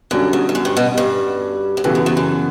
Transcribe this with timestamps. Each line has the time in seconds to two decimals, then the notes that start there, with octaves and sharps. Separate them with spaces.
0.11 F#2 D3 G3 C#4 F#4 A4
0.33 E2
0.49 E2
0.55 F#2
0.65 G2
0.77 B2
0.97 G2
1.77 F#2
1.84 G2 C#3 E3 B3 F#4 A4
1.95 F#2
2.06 E2
2.17 F#2